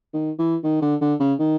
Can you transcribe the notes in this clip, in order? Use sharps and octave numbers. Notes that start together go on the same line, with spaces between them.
D#3
E3
D#3
D3
D3
C#3
D#3